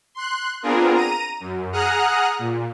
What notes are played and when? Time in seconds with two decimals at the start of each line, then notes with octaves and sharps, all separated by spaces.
0.15 C6 F#6
0.62 B3 C4 D4 F4 G#4 A#4
0.93 A#5 D#7
1.40 F#2
1.72 G#4 F#5 A#5 D#6 F6 F#6
2.39 A#2